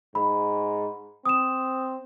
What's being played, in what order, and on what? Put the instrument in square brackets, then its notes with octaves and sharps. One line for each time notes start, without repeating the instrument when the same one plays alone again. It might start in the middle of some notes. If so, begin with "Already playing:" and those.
[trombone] G#2 [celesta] B5
[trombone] C4 [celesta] D#6 E7